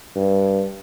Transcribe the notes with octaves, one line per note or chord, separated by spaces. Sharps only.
G2